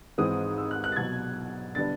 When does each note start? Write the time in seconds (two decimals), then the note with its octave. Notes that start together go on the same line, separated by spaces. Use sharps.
0.18 G#1 G#2 E3 G#3 C4 D#6
0.58 E6
0.71 F#6
0.84 F#6
0.92 A6
0.96 C2 B2 F#3 G#6
1.75 D3 G3 B3 D4 A6